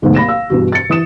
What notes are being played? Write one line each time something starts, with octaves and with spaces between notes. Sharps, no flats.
D2 G#2 B2 F#3 A3
A#3 B5 A#6 E7
F5 E6
G2 B2 E3 F#4
A6 C#7
E3 D#6 E7